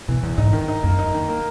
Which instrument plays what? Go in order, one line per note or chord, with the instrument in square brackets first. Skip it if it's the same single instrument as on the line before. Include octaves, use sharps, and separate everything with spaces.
[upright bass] B2 [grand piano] E3
[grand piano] E2 [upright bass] A#2
[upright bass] G#2 [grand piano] D#4
[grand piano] D#3
D#4
[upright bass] F#2 [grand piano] A#3
[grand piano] D#4
D#3
A#3